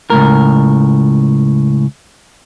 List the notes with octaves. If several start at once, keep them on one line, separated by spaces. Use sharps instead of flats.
C#2 F#2 A2 A#4